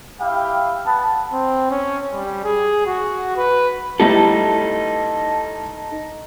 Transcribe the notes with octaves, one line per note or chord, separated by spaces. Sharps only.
E4 G4 F5 G5
B3 A5
C4
C#4
G3
G#4
F#4
B4
G3 A3 D#4 E4 A4